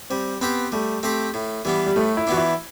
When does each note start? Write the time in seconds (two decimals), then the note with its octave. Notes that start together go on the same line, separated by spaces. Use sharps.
0.10 G3 C4
0.41 B3 C4 G4 C5
0.72 G3 A3
1.03 A3 C4 G4 C5
1.34 A2
1.65 E3 G3 B3 D4
1.86 G3
1.96 A2 A3
2.17 E4
2.27 E3 B3 D4 F#4
2.37 E4